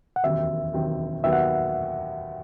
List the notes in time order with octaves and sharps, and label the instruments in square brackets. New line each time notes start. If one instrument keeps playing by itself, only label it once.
[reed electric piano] F#5
[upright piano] E1 D#2 D#3 F#3 C4 [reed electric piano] E5
[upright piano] E1 D#2 D#3 F#3 C4
[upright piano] D#2 D#3 F#3 B3 [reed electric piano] E5
[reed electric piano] F#5